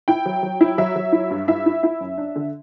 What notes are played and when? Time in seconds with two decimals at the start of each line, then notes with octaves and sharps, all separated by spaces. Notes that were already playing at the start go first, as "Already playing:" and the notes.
0.08 E4 G5
0.26 F#3
0.43 F#3
0.61 E4
0.78 F#3 E5
0.96 F#3
1.12 E4
1.31 G2
1.48 E4 E5
1.66 E4
1.83 E4 E5
2.00 F#2
2.18 D4
2.36 D3